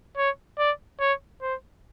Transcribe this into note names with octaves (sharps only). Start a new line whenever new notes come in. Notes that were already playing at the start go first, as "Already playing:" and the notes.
C#5
D5
C#5
C5